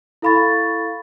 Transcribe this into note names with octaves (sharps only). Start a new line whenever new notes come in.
E4 A4 F5 B5 C#6 A6